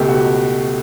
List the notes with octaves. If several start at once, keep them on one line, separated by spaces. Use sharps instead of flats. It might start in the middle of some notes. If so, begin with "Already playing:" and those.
Already playing: C#2 B2 A3 G4
F#4